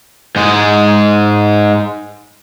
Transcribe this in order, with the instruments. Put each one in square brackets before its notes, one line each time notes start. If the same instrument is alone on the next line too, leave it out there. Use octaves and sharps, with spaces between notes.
[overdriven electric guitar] G#2 G#3